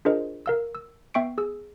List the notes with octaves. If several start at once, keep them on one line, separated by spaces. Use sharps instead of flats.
D4 F4 G#4 A#4 C5 D#5
A#4 F5 E6
E6
B3 E5 G5 C#6 C7 D7
G#4 E6